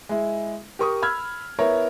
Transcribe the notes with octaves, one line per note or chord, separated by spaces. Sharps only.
G#3 E4
G4 A#4 C#6 D#6
B5 E6 F6 G#6
B3 E4 A#4 C#5 A#5